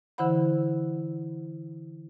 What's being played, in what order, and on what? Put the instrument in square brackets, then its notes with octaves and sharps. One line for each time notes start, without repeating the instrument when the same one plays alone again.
[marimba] D3 E3 E4 C5 F#5 B5